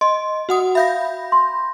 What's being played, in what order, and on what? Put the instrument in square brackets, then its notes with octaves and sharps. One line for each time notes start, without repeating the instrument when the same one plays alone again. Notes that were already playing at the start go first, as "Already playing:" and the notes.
[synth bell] D#5 [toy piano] C6
[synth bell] F#4 F#5 D#6
[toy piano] E5 F5 [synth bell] B5 G6 A#6
[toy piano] C6